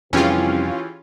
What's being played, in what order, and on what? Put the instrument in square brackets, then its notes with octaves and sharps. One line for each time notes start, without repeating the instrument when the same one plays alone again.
[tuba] C2 [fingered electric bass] F2 [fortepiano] E3 G4 G#4 [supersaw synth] C#4 F4